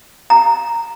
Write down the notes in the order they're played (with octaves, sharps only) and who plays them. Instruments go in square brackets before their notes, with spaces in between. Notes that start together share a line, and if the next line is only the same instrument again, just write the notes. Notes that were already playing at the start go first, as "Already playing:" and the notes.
[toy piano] A#5